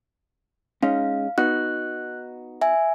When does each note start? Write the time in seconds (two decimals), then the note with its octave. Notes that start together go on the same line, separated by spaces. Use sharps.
0.83 G#3 C#4 D#4 F5
1.38 B3 D#4 F#4 F#6
2.61 E5 G#5